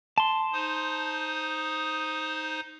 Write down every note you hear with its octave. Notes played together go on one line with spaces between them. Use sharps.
A5 C6
D#4 C5 D#6